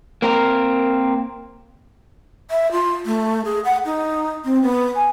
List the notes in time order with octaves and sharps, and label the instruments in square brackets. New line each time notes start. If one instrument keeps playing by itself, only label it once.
[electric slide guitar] A#3 C4 A#4
[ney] E5
F4
A3
G#4
F#5
D#4
C4
B3
G#5